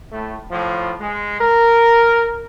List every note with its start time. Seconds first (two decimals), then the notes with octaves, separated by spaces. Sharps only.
0.12 A2 A3
0.51 A2 F3
1.00 G#3
1.41 A#4